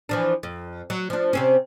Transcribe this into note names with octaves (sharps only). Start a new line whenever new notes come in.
E3 F3 D4
F2
F#3
F3 D4
C3 C4 C#4